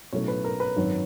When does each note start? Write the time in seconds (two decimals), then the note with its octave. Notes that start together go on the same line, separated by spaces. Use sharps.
0.13 B1 A2 F#3 A3 C#4 C#5
0.28 B4
0.44 A#4
0.60 B4
0.76 G#1 F#2 D#3 F#3